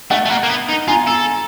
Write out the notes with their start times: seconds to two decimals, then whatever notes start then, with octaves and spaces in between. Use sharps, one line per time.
0.11 A3 E5 F#5
0.25 A3
0.30 A#3
0.43 A#3
0.49 B3
0.69 D#4
0.88 F4 G#5 A#5
1.07 A4